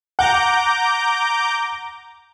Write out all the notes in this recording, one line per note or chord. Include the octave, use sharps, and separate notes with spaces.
F#5 A#5 D6 G6